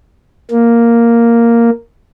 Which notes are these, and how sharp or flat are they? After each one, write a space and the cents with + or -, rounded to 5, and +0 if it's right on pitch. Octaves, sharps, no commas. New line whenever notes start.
A#3 +0